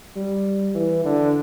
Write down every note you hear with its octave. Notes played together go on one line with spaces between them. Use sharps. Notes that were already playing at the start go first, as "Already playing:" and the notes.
G3
E3
D3